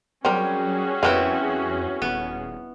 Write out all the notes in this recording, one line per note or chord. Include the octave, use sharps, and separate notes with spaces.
F#3 G3 C4 C#4 F#4 G#4 A#4
F2 B3 C4 E4 A#4 B4 F5
D#1 B3